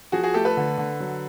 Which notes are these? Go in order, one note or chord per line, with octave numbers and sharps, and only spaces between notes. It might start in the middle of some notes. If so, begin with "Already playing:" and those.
F3 F#4 G#4
F#4 G#4
A3 G4 A4
A4 B4
D3
D3
F#3